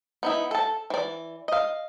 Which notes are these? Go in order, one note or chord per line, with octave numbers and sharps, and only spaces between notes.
B3 D#4 E4
A4 A5
E3 D5
D#5 F5